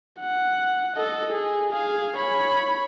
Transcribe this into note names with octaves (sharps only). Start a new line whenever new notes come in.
F#5
A4 D#5
G#4
G#4 F5
C#5 B5